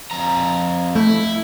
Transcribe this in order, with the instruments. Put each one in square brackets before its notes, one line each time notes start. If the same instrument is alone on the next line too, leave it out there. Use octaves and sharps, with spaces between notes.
[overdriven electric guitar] F2 A#5
[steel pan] A3 [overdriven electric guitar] E4